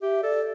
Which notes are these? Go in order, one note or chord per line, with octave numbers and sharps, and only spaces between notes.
G4 E5
A4 D5